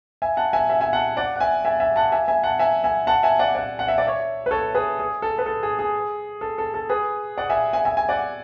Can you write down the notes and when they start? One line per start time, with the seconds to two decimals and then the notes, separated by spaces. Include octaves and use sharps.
0.22 E5 G#5
0.37 F#5 A5
0.53 E5 G#5
0.69 E5 G#5
0.81 E5 G#5
0.93 F#5 A5
1.17 D5 F#5
1.36 F#5
1.40 E5 G#5
1.65 E5 G#5
1.80 E5 G#5
1.96 F#5 A5
2.12 E5 G#5
2.28 E5 G#5
2.43 F#5 A5
2.59 E5 G#5
2.84 E5 G#5
3.07 F#5 A5
3.23 E5 G#5
3.39 D5 F#5
3.55 D5 F#5
3.79 F#5
3.88 E5
3.98 D5
4.07 C#5 E5
4.46 B4
4.51 A4 C#5
4.75 G#4 B4
4.99 G#4
5.22 A4
5.38 B4
5.46 A4
5.63 G#4
5.79 G#4
6.41 A4
6.58 A4
6.74 A4
6.89 G#4 B4
7.37 D5 F#5
7.50 E5 G#5
7.73 E5 G#5
7.85 E5 G#5
7.97 G#5
8.09 D5 F#5